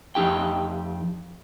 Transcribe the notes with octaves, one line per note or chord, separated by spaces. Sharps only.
F2 D#4 G4 G5